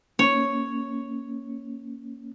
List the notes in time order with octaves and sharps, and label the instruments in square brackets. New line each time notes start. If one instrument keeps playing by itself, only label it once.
[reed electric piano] A#3 C#4 [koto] C#5